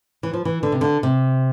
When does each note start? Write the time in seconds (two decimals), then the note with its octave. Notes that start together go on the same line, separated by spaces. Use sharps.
0.23 E3
0.33 F3
0.45 E3
0.63 D3
0.72 C3
0.81 D3
1.03 C3